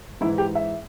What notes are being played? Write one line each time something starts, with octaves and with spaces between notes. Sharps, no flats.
G#2 E3 E4
G4
E5